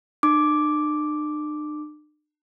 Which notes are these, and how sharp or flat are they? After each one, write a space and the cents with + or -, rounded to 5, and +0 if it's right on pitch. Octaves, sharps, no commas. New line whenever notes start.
D4 +45 D6 +0